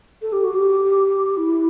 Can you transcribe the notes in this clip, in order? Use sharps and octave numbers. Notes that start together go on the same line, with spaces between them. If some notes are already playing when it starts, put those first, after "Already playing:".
A4
G4
F#4
G4
E4